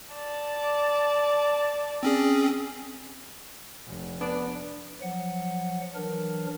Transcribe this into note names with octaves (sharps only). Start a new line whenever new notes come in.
D5 A5
C4 C#4 G#4
F1
B3 D4
F3 F#3 F#5
E3 F#3 D4 A#4